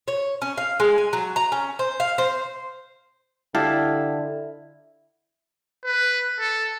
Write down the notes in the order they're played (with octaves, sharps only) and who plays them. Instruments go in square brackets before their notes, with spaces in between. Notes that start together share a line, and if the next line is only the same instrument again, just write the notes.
[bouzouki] C#5
C#4
F5
G#3
G#5
F#3
A#5
C#4
C5
F5
C5
[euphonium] D3 [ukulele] E4 [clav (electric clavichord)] G4 F5 A5
[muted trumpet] B4
A4